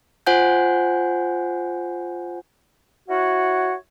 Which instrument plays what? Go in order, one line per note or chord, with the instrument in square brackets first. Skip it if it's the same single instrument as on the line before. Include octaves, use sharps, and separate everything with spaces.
[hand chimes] F4 C5 F#5 G#5 G6
[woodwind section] E4 F#4 C#5 F#5